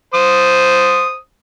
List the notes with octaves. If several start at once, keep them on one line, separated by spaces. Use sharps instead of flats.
C5 D#6